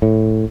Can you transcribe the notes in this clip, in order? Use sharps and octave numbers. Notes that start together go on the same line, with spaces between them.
A2